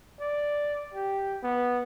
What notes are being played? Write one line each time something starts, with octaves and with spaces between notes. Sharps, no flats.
D5
G4
B3